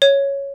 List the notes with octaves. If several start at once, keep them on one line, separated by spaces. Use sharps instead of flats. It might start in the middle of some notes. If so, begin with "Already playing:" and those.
C#5